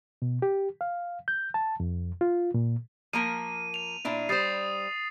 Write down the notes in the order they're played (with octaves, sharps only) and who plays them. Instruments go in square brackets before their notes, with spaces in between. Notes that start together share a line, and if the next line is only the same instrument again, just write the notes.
[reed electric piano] B2
G4
F5
G6
A5
F2
F4
A#2
[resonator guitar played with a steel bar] F3 A#3 A#4 [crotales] D#7
[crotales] D#7 F7
[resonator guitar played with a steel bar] A#2 D4 E4
[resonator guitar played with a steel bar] G3 C5 [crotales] D#6 A6 C7